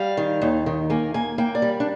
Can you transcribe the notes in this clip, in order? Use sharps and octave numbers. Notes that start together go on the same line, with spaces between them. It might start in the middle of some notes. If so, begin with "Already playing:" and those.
Already playing: G3 F5
D#3
D#2
D#3
A#3 G#5
A#3 G#5
A#3 G5
D5
G3
D4